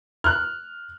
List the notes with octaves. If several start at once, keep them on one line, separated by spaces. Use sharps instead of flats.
F6 F#6